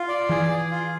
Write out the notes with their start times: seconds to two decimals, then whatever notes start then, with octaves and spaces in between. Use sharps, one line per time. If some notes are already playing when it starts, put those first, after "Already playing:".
Already playing: F4
0.08 D5
0.30 E3 G#4
0.49 G#4
0.71 F4